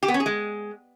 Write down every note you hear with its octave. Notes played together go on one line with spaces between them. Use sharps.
G4
B3
C#4
G#4
G#3